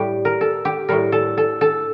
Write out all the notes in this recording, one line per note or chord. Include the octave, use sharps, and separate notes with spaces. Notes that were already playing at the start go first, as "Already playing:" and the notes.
Already playing: A2 G3 G4
A#4
A4
G4
A2 G3 A#4
A4
A4
A4